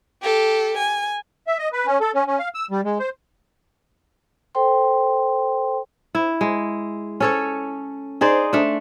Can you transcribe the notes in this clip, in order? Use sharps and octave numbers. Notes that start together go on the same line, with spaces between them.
G4 A4
G#5
E5
D#5
B4
C#4
A4
C#4
C#4
F5
E6
G3
G#3
C5
A4 C5 G5 C6
E4
G#3
C#4 A4 C#5
D#4 G#4 C5 D5
A3 D4